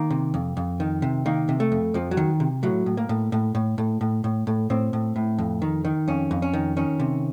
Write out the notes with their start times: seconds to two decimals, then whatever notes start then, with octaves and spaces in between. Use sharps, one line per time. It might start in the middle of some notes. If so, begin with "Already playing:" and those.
Already playing: D#3 A#3
0.10 C3
0.34 F2
0.57 F2
0.80 D#3
1.02 C3
1.26 D#3 A#3
1.49 C3
1.60 A3
1.72 F2
1.94 F2 F3
2.11 F#3
2.17 D#3
2.40 C3
2.63 A2 F#3
2.86 A2
2.97 A#3
3.09 A2
3.32 A2
3.55 A2
3.78 A2
4.01 A2
4.24 A2
4.47 A2
4.70 A2 C4
4.93 A2
5.16 A2
5.39 F2
5.62 D#3
5.85 D#3
6.08 F2 C#4
6.31 F2
6.42 C#4
6.54 D#3
6.77 D#3 C#4
6.99 C3